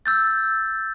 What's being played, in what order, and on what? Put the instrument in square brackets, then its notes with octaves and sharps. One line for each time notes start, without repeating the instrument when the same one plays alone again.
[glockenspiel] E6 G6 A6